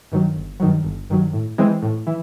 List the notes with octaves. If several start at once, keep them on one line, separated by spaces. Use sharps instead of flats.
G2 D#3 F#3
G1
G2 D#3 F#3
G1
G2 D#3 F#3
A2
E3 G#3 C4
A2
E3